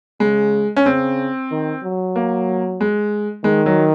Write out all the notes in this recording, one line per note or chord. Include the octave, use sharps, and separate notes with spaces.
C#3 G#3
C#4
C#3 C4
D#3
F#3
A#3
G#3
D#3 G#3
F#3